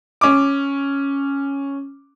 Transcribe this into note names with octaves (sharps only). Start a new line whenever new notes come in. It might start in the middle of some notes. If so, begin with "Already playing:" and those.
C#4 D6